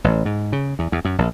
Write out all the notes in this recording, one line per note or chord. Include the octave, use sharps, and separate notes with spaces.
A1
G#2
C#3
E2
E2
F#2
A#1